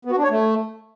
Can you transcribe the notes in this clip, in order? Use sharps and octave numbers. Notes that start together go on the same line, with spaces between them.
B3
F#4
D4
C#5
A3